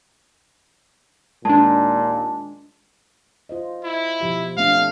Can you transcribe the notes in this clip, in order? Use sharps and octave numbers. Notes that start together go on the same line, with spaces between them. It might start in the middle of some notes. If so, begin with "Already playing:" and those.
D#2 A#2 G#3 D4 A5
F4 C5 D#5
E4
B2 F3 G4
A3 C4 D4 F5